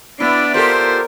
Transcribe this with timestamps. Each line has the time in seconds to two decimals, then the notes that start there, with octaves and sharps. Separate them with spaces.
0.20 B3 D4 E4 D5
0.54 F4 G4 A4 A#4 C5